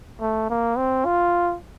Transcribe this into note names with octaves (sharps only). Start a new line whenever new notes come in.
A3
A#3
C4
F4